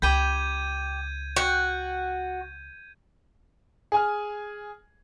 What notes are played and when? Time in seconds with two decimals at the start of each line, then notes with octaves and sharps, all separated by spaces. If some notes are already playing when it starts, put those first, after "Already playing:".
0.02 C#2 G4 G5 B5 G6 G#6 D#7
1.36 F#4 G5
3.92 G#4 G#5 F6